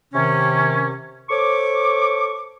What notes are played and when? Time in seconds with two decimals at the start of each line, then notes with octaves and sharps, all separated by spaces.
0.13 C3 D#3 C#4
1.30 A4 C5 C#5 C#6 D6